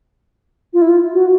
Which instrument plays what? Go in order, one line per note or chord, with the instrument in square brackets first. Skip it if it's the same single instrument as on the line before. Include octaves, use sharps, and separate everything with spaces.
[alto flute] F4
E4
F4
F#4